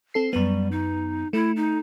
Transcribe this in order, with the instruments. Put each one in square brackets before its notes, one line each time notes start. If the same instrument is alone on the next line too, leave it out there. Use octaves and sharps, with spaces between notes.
[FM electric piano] C4 A4 C7
[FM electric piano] F#2 B3 [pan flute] G3
[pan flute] D#4
[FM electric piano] A3 [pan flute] E4
[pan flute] D#4